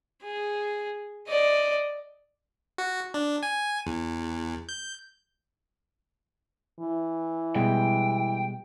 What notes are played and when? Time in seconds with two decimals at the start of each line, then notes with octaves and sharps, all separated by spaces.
0.23 G#4
1.28 D5 D#5
2.78 F#4
3.14 D4
3.43 G#5
3.86 E2
4.69 G6
6.80 E3
7.55 B2 G3 G#3 G5